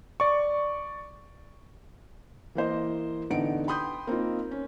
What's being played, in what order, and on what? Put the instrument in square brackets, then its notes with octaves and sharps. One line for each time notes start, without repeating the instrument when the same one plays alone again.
[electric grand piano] D5 C#6
[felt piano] E3 A#3 C5 D#5
A1 D3 B3 D#4 D7
G5 B5 C6 D#6 G6
A#3 C4 D#4 F4
C#4